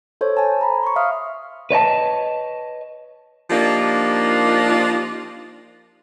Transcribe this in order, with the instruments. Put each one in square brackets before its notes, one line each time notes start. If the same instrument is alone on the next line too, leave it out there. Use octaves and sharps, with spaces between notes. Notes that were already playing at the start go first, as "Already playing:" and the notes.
[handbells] A4 C5 C#5
G#5 A5
A#5 B5
C6 C#6
E5 F5 D#6 F6
[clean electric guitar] B4 C#5 D#5 A5
[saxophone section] F3 A#3 D4 D#4 F4 G4